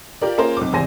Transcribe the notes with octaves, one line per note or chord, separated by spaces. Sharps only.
F4 G4 A#4 D5
A#3 C#4 F4 G#4 A#4 C5
B1 C4 D6
G#1 E2 C3 C5 G#5 A#6